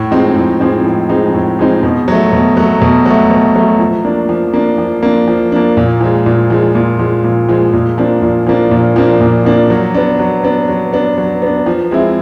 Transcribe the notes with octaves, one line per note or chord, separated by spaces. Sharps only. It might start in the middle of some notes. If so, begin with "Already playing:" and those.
Already playing: A2
F3 G#3 C4 D#4
A2
F3 G#3 C4 D#4
A2
F3 G#3 C4 D#4
A2
F3 G#3 C4 D#4
B2
F#3 A3
B2
F#3 A3
B2
F#3 A3
B2
F#3 A3
F3
A#3 D4
F3
A#3 D4
F3
A#3 D4
F3
A#3 D4
A#2
F3 G#3
A#2
F3 G#3
A#2
F3 G#3
A#2
F3 G#3
A#2
F3 A#3 D4
A#2
F3 A#3 D4
A#2
F3 A#3 D4
A#2
F3 A#3 D4
F#3
B3 D4
F#3
B3 D4
F#3
B3 D4
F#3
B3 D4
F3
G#3 C4 E4